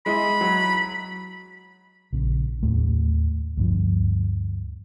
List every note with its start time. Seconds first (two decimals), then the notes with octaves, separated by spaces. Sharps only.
0.06 G#3 E4 D#5 B5
0.41 F#3
0.73 B6
2.12 A#1 C#3
2.63 D#2 A2 A3
3.57 D2 G2 F3